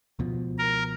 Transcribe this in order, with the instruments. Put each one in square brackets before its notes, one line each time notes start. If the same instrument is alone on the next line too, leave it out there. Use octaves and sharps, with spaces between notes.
[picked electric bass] C#2 B2 F3
[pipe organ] A#4